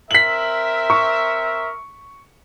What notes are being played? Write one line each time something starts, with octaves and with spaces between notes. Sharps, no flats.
C4 A#4 E5 B6 F#7
C#6